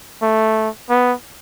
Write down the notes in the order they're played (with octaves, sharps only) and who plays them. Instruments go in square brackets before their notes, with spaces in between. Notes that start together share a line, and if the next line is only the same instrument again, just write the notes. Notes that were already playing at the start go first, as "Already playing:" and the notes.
[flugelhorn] A3
B3